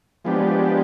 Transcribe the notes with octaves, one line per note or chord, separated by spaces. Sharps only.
F3 G#3 B3 D4 G4